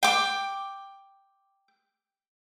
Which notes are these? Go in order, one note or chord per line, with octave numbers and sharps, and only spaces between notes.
G5 D6